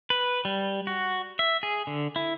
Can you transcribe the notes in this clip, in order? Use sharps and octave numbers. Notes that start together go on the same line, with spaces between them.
B4
G3
F#4
E5
G#4
D3
E4